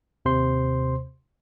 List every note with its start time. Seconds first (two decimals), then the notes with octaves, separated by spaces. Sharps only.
0.25 D#2 C3 C5 C6